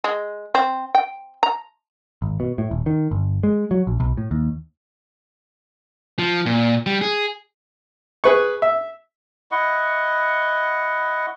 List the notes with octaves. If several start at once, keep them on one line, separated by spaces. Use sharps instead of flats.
G#3
C4
G5
A#5
G#1
B2
A2
D#1
D#3
G1
G#3
F#3
A#1
B1
A2
D#2
F3
A#2
G3
G#4
G#4 B4 C#6
E5
E4 D#5 F#5 C#6